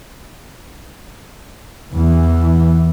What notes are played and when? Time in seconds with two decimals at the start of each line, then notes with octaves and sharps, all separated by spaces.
1.93 E2 E3